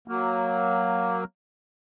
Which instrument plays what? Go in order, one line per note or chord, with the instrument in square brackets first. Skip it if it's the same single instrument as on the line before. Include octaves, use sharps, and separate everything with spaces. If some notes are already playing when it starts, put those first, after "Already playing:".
[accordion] F#3 A#3